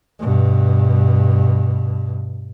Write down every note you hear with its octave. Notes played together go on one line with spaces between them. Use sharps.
G2 B2